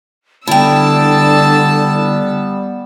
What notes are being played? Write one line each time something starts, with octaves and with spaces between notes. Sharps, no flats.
D3 G3 B3 E4 G5 A5 E6